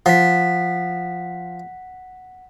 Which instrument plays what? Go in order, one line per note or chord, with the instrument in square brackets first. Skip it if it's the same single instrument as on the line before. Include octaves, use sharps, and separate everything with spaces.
[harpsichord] F3 [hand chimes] F#5 B6